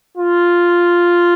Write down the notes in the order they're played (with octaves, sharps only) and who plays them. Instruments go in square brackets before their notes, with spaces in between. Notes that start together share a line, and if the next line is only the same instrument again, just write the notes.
[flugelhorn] F4